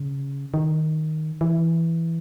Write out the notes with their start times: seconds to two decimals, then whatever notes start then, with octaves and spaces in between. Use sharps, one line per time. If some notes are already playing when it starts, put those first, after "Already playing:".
Already playing: C#3
0.54 D#3
1.41 E3